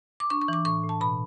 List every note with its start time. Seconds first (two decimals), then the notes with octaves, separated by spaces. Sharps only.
0.20 D6
0.30 D4 C#6
0.41 C#6
0.48 E3 D6
0.65 A2 C#6
0.83 A2
0.89 A5
1.01 B2 B5